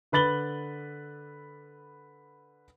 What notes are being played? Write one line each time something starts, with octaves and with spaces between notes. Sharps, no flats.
D3 B4 B5 A6 F#7 G7